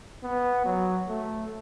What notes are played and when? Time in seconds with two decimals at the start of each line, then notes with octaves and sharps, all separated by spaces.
0.24 B3
0.65 F#3
1.09 A3